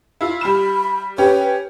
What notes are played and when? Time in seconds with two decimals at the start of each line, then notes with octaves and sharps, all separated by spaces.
0.21 E4 F4
0.41 G3 B5 F6 E7
1.18 C#4 G4 B4